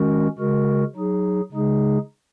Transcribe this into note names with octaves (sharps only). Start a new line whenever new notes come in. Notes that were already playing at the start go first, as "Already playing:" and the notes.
Already playing: D#3 G#3 C#4 F#4 A#4
C#3 G#3 F#4 A#4
F#3 D#4 G#4
C#3 G#3 D#4 G#4